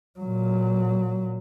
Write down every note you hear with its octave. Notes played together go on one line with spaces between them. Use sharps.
A#2 F#3